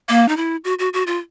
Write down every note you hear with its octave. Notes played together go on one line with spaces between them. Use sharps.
A#3
D#4
E4
F#4
F#4
F#4
F4